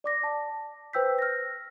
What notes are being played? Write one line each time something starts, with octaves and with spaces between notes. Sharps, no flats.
D5 D6 A#6
A5
B4 C5 G5 E6 G6 B6
F6 A#6